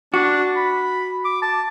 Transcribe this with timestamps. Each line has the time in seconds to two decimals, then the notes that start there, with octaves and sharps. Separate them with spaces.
0.14 D4 F#4
0.56 B5
1.25 D6
1.42 A5